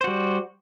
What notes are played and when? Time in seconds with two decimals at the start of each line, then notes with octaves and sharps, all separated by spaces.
0.01 C5
0.04 F#4
0.07 G3